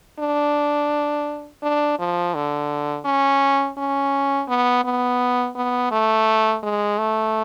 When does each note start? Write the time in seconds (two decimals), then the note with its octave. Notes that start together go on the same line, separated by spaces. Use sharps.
0.19 D4
1.63 D4
1.99 F3
2.35 D3
3.05 C#4
3.78 C#4
4.48 B3
4.84 B3
5.56 B3
5.91 A3
6.63 G#3
6.98 A3